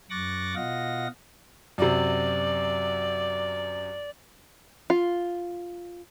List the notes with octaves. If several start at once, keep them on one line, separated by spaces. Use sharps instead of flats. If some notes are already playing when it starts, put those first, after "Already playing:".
F#2 C#6 D6 F#6 A6 A#6
B2 F4 D#5 F5 F#5 A#6
F#2 C3 D5
F4